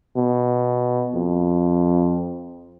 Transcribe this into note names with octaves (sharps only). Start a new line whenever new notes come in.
B2
F2